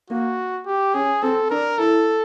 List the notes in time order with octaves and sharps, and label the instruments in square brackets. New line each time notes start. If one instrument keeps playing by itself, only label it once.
[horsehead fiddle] A#3 [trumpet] F#4
[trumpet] G4
[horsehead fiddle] C#4 [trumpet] G#4
[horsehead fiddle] C4 [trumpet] A4
[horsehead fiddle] D4 [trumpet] A#4
[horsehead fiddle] E4 [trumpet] A4